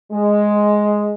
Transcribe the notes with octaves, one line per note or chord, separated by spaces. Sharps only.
G#3